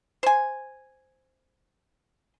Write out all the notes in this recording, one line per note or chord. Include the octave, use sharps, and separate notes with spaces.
C5 G#5